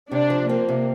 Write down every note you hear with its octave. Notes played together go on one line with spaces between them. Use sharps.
C3 D4
F3
A#3 C4
C3